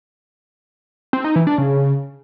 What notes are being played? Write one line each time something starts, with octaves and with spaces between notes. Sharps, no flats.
C4
D#4
E3
D4
C#3